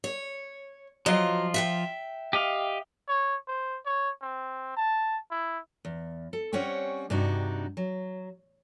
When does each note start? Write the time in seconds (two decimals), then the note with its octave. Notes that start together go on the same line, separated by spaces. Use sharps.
0.04 C#5
1.06 F3 F#3 F4 D#5
1.54 E5 F#5 G5
2.33 G4 D#5 F5
3.08 C#5
3.48 C5
3.85 C#5
4.21 C4
4.76 A5
5.31 E4
5.85 E2
6.33 A4
6.53 G3 C4 C#4 C#5 F#5 G5
7.10 G2 C3 D4 D#4 F#4
7.77 F#3